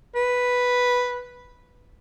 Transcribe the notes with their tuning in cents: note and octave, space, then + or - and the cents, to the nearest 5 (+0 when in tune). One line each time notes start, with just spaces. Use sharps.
B4 -5